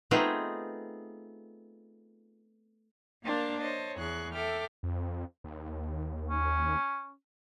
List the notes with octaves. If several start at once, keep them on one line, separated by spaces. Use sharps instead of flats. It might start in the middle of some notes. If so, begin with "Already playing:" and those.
A3 B3 C4 D#4 F4 G#4
A#3 D4 A#4 C5 F5 A5
C5 C#5 D#5 A5
E2 G#4 C#6 F#6
A4 E5 G5 D6 F6
F2
D#2
C#4